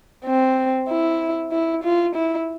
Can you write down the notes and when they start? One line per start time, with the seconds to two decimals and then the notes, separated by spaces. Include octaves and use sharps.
0.26 C4
0.89 E4
1.52 E4
1.84 F4
2.15 E4